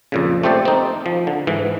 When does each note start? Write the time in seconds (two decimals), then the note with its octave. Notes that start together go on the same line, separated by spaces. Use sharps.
0.12 F2 A#2 C#3
0.43 A3 C4 G4 C5 D5
0.65 C4 D#4
1.06 F3
1.27 D3
1.47 G#2 E3